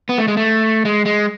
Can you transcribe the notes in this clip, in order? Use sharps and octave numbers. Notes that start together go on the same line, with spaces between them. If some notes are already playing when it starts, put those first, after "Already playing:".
B3
A3
G#3
A3
G#3
G#3